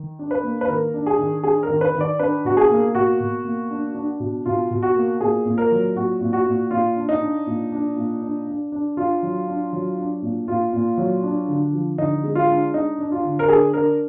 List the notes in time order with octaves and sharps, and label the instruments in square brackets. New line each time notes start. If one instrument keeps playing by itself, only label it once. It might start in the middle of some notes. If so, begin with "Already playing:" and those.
Already playing: [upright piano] D#3
D4
B4
A#3
B4
D#3 A#4
D4
G#4
D#3
D4 G#4
A#4
D#3
B4
D#3
D5
D4 B4
B2 F#4
G#4
A#3
B2 F#4
B2
A#3
D4
D4
B2
B2 F4
B2
F#4
A#3
A#2 G#4
A#2
A#4
F#3
A#2 F#4
A#2
F#4
A#2
A#2 F4
D4
D#4
D4
A#2
D4
A#2
D4
D4
D4
D4 F4
F#3
D4
F#3
D4
A#2
A#2 F4
A#2
F#3
D4
D3
F3
D3 D#4
G#3
F4
D4
D4 D#4
D4
F4
D3
A#4
D4 G#4
D4 A#4